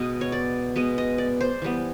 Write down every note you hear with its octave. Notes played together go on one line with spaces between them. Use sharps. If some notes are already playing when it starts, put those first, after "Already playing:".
Already playing: B2 G#3 B3 D#5
C#5
D5
B2 G#3 B3 D#5
D#5
D5
C5
E3 G3 B3